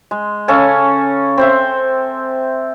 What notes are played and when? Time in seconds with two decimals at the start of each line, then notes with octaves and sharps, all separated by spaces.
0.11 G#3
0.48 C#3 C#4 A4 G#5
1.38 C4 C5 E5